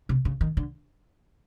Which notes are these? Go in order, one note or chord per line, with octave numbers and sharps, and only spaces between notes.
C3
C#3
D#3
D3